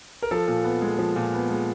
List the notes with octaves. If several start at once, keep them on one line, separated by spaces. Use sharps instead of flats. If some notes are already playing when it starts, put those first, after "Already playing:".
A#4
F3 A4
A#2
B3
G#3
F3
A#2
B3
G#3